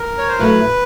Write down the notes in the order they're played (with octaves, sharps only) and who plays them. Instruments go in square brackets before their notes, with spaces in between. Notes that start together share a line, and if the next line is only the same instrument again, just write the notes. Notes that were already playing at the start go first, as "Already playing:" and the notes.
Already playing: [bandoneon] A#4
C#5
C5
[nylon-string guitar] A2 F#3 A3 [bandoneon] B4